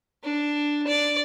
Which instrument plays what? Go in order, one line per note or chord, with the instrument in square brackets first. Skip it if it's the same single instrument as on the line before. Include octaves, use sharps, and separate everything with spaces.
[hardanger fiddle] D4
D5